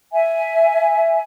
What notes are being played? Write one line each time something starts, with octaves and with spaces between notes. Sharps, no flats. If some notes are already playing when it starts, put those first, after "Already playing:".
E5 G#5